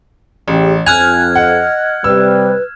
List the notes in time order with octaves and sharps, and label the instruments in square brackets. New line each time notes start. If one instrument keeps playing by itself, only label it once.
[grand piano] A1 [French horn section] C#3 G4
[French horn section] F2 [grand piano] G#5 F7 [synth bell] F6 F#6 G#6
[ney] D#5 [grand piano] F#5
[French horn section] C3 G3 [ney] B4 [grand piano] E6